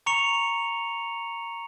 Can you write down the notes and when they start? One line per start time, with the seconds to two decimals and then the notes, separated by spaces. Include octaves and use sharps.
0.06 A#5 C#6 C#7 F7